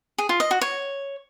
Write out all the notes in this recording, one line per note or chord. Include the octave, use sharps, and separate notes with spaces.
G#4
F4
D#5
F#4
C#5